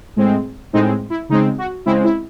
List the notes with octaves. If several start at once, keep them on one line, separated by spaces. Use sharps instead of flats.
A2 G#3 C4
A2 G#3 C4 D#4
E4
C#3 G#3 C4 D#4
F#4
C#3 G#3 C4 E4
E4